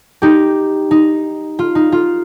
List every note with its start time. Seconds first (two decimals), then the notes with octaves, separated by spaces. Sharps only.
0.22 D#4 G4
0.91 D#4
1.59 F4
1.75 D#4
1.92 F4